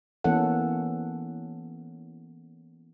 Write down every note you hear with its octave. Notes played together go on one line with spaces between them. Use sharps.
E3 A#3 B3 C#4 A4 F#5